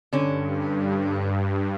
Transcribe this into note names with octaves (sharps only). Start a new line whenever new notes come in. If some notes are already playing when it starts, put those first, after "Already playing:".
G2 D3 C#4